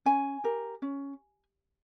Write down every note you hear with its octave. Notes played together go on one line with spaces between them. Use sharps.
C#4 G#5
G4 A#4
C#4